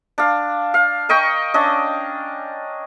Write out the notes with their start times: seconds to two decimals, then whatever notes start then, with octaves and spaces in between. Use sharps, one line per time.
0.18 D4 F5
0.74 F5
1.09 A#4 D#5 G5 C#6
1.54 C#4 D4 D#5